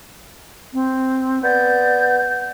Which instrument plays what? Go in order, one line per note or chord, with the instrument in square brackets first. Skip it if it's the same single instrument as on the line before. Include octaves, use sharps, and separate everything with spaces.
[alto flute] C4
[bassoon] B3 [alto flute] D5 [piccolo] G6